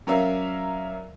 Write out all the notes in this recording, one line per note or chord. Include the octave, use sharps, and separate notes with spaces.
F#3 C#4 A#4 D5 E5 F5